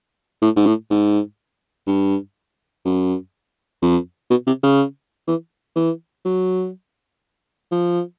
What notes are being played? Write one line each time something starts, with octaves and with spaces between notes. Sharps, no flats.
A2
G#2
A2
G#2
G2
F#2
F2
B2
C3
C#3
E3
E3
F#3
F3